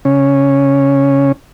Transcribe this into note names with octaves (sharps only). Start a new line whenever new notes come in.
C#3 C#4